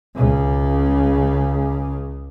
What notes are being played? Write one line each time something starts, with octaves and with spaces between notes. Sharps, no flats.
C#2 C#3